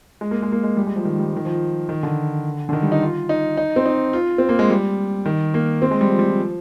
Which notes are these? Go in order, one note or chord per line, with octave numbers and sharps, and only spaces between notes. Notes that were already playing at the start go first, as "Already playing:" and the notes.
G#3
A#3
G#3
A#3
G#3
G3
G#3
F3
D#3
G3
F3
D#3
F3
D#3
D3
D3
D#3
G3
D#4
F4
D#4
D#4
C4
D#4
F4
C4
A#3
G#3
G3
D#3
A#3
C4
G#3
G3
F3
G3
F3